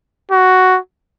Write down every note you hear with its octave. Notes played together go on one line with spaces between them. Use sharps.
F#4